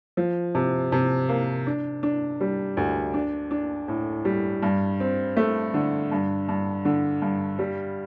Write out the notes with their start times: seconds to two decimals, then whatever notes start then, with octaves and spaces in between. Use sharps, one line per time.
0.17 F3
0.55 C3
0.92 C3
1.29 A#3
1.67 D4
2.03 D4
2.41 G3
2.77 D2
3.14 D4
3.51 D4
3.88 A2
4.25 G3
4.63 G2
5.00 C4
5.37 A3
5.74 D3
6.11 G2
6.49 G2
6.85 D3
7.22 G2
7.59 G3